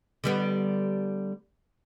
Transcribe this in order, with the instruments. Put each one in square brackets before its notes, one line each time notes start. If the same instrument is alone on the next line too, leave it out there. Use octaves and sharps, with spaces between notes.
[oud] D3 G3 B3